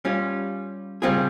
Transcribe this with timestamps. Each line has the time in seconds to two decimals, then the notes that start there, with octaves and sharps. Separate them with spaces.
0.05 G3 C#4 F4
1.02 C#3 G3 C4 F4 G#4